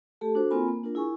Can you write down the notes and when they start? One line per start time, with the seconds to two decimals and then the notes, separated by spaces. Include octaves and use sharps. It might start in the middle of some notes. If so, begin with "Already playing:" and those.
0.21 A3 G4 A4 A5
0.35 D4 F#4 A4 C5
0.51 A#3 C4 F4 A#4 G#5 B5
0.68 A#3
0.84 D4 F4 A#4
0.95 E4 G#4 G#5 C#6